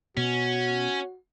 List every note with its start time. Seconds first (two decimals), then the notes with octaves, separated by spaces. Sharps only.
0.17 B2 C#4 F#4